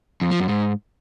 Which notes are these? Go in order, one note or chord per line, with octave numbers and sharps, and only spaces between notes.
F2
F3
F#2
G#2